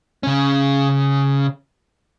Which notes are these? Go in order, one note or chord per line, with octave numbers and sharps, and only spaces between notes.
C#3 C#4